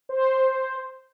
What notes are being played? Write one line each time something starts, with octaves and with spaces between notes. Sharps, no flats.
C5